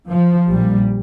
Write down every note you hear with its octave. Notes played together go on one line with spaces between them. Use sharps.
F3
A#1 A#2 G3